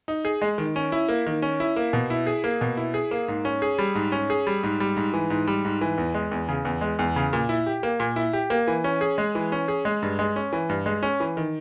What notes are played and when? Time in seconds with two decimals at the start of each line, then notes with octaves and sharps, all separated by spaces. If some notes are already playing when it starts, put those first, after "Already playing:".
0.08 D#4
0.25 G#4
0.42 G#3
0.58 D#3
0.76 C#4
0.92 E4
1.09 A#3
1.26 D#3
1.42 C#4
1.60 E4
1.76 A#3
1.93 B2
2.10 E4
2.26 G#4
2.44 A#3
2.61 B2
2.77 E4
2.94 G#4
3.11 A#3
3.28 G#2
3.45 C#4
3.62 G#4
3.79 G3
3.95 G#2
4.12 C#4
4.30 G#4
4.47 G3
4.63 G#2
4.80 G3
4.96 G#2
5.14 E3
5.30 G#2
5.48 G3
5.65 G#2
5.81 E3
5.98 E2
6.15 G#3
6.31 E2
6.48 C#3
6.65 E2
6.81 G#3
6.99 E2
7.16 C#3
7.33 A#2
7.49 E4
7.66 G4
7.83 A#3
8.00 A#2
8.16 E4
8.33 G4
8.50 A#3
8.67 E3
8.84 C#4
9.01 G#4
9.18 G#3
9.35 E3
9.52 C#4
9.68 G#4
9.85 G#3
10.02 G2
10.19 G#3
10.36 C#4
10.53 E3
10.69 G2
10.86 G#3
11.03 C#4
11.20 E3
11.37 D#3